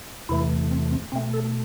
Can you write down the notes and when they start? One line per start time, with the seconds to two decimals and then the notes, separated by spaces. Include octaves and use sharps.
0.29 E2 C3 E3 A3 E4
0.71 C4
0.91 C4
1.12 B2 A3 C4
1.34 A4